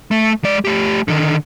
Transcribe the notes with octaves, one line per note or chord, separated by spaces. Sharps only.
A3
G#3 D5
A3 G4
D3 D#3